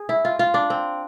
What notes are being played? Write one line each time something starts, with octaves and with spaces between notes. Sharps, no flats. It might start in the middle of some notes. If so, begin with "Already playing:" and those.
Already playing: G#4
E4
F4
F4
D4
C4